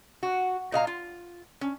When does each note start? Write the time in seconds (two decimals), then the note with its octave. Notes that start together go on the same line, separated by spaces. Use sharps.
0.23 F#4
0.72 A#2 D#5 F5 A#5
0.87 F4
1.61 C#4